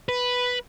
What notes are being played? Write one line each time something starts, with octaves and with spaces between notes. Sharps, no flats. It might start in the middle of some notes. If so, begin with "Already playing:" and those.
B4